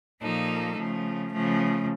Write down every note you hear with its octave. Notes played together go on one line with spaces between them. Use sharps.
A#2 F3 A#3 D#4 A4
C#3 F3 A3
C#3 F3 A3